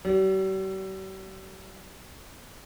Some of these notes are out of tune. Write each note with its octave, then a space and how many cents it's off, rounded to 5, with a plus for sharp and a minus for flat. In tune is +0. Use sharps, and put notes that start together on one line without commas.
G3 -45